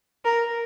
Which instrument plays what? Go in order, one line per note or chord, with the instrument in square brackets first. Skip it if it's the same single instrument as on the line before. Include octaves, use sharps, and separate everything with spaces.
[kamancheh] A#4